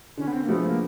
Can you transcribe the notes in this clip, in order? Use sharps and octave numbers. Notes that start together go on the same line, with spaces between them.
D3 C#4
B3
C4
A#3
F3 G#3 A3 B3
A#3